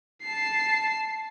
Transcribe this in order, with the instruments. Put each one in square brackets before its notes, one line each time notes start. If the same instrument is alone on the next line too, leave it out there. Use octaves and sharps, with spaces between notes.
[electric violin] A5 C7